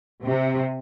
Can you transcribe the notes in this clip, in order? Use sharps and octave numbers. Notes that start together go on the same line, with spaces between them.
C3